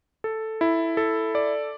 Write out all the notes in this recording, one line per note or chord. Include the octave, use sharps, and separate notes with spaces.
A4
E4
A4
D5